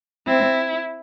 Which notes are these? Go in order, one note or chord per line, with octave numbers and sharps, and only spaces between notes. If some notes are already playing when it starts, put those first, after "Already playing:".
C4 E4